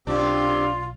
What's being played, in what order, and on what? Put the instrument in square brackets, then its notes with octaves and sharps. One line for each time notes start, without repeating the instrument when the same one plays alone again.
[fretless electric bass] B1 [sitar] F#2 D4 [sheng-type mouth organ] C4 G4 [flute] F4